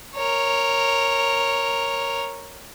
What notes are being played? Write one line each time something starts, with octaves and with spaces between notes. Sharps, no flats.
A#4 C#5